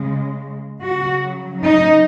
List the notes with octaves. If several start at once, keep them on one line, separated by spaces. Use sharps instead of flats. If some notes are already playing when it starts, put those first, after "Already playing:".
Already playing: C#3 G#3
C#3 F#3 F#4
D#4